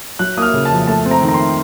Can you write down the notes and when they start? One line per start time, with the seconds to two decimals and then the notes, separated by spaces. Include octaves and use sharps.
0.19 F#3 F#6
0.37 A#3 D#6
0.42 F6
0.54 C#3
0.65 A5
0.71 F2
0.87 A3 A5
1.06 C4
1.11 A#5
1.22 D#3
1.28 A#5
1.34 C6